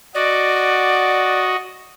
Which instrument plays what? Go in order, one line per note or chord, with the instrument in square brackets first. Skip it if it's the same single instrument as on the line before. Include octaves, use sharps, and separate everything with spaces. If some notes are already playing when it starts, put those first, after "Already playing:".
[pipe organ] F#4 D#5 [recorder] D5